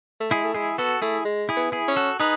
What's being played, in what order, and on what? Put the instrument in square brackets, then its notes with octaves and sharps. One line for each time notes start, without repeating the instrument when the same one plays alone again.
[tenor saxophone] A3
[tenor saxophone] G#3 [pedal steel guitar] E4 G#4
[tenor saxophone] A3
[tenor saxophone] G#3 [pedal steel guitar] E4 G#4
[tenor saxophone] B3 [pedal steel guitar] F#4 A4
[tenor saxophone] A3 [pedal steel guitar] E4 G#4
[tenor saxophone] G#3
[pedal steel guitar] E4 G#4
[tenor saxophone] B3
[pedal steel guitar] E4 G#4
[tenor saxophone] C#4
[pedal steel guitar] F#4 A4
[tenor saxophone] D#4 [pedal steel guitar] G#4 B4